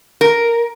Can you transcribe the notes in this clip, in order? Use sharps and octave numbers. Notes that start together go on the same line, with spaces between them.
A#4